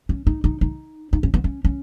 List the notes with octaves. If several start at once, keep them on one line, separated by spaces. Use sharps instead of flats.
C#4
D#4
D#4
D#4
D#4
C#4
B3
C#4
C#4